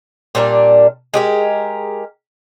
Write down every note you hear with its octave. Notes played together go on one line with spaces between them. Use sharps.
A#2 G3 D4 A#4
G#3 G4 A#4